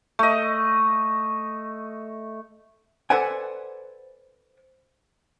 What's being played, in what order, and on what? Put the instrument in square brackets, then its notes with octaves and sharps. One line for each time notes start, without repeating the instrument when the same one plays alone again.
[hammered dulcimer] A3 D#5
[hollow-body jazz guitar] A4 B4 C5 D5 F#5 G#5